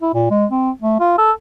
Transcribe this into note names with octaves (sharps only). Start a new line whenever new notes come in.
E4
A#2
G#3
C4
A3
F4
A4